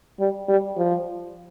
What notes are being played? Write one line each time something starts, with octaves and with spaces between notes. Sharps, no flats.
G3
G3
F3